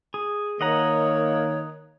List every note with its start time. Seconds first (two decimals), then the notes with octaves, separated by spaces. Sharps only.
0.14 G#4
0.61 D#3 A#3 C#5 D#5 F#5 A#5